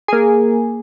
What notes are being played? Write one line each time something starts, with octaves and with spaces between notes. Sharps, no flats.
A#3 G#4